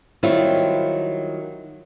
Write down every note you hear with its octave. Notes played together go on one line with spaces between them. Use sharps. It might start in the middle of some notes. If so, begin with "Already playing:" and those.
D#3 F#3 G3 C4 E4 F4